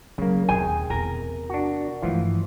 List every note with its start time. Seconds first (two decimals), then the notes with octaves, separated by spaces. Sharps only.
0.18 C#3 F#3 A#3
0.49 D#2 C3 G#4 G5 G#5
0.90 E2 C3 A#4
1.49 D4 F#4
2.02 G2 E3 F3 A3 F4